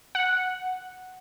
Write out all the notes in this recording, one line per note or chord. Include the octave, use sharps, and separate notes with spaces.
F#5